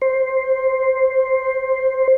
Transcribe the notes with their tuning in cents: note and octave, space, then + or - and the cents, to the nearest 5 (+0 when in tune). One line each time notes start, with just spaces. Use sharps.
C5 +5